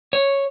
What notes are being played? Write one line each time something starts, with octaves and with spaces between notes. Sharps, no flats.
C#5